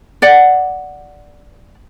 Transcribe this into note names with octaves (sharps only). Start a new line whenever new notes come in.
D5 F#5